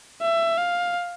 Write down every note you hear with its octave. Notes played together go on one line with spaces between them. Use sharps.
E5
F5